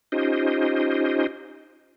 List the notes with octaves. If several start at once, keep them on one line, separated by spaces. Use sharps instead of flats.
C#4 D#4 F4 G4 C5 D#5